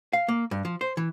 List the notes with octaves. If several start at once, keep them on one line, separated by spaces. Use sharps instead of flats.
F5
A#3
G2
F3
C5
E3